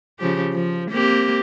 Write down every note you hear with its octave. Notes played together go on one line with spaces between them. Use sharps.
C#3 F3 G4
F3
A#3 C4 G4